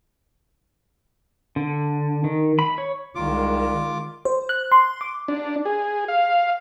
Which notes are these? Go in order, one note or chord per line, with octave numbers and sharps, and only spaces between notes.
D3
D#3
B5
C#5
C2 D#3 G#3 F4 D6
C5
F#6
C6
D6
D4
G#4
F5